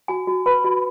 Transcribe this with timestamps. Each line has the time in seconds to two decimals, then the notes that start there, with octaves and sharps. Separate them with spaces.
0.08 F#4 G#5
0.27 F#4
0.46 B4 B5
0.64 F#4